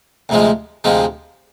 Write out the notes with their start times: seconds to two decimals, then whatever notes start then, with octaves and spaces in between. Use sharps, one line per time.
0.29 D2 C3 F3 G#3
0.84 D2 C3 F3 G#3